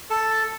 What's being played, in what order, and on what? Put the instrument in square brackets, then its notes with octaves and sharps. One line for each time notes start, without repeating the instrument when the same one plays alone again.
[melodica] A4 A5